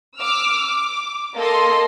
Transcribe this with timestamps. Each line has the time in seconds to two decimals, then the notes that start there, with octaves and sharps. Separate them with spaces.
0.17 D6 E6 F6
0.66 D6
1.36 A#3 A4 D#5 C6